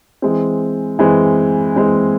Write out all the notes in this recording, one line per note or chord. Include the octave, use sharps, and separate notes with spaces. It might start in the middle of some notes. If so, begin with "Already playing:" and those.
E3 G#3 C4
E3 G#3 C4
E3 G#3 C4